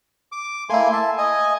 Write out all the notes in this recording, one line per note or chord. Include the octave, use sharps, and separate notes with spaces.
D6
A3 A#3 E4 G#5 C6
E5 A5
D#5 G#5